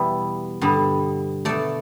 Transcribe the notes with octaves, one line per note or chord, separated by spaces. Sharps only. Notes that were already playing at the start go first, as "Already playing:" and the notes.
Already playing: E2 B2 G3 B3 E5
G2 D3 G3 B3
B2 A3 D5